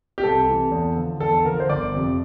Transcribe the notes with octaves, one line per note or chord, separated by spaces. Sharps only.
G4
C2 A4
C3 E3
E2
D3 F3
E2 A4
D3 F3 A#4
C5
G1 D5
F2 C3 F3